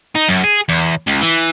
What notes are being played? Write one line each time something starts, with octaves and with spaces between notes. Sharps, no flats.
D#4
F#2
G#4
E2
C#2
E3